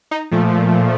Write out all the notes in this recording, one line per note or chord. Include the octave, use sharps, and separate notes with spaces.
D#4
A#2 F3 A3